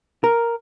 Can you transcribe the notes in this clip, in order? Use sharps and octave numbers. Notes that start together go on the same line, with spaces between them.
A#4